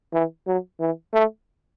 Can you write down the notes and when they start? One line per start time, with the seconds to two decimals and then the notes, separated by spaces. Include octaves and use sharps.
0.13 E3
0.47 F#3
0.80 E3
1.14 A3